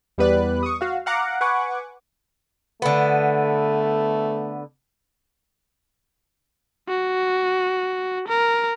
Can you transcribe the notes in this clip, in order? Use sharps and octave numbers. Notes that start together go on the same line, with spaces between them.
E2 G3 B3 B4 D5 F#6
C#6 D#6
F#4 F5
F5 F#5 A#5 D6
B4 F#5 G#5 C#6 D6
D3 A3 B3
F#4
A#4